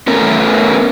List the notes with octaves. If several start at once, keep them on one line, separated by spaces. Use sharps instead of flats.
A3 B3 C#4 A#4